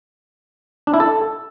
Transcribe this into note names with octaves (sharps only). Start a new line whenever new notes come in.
D4
E4
A4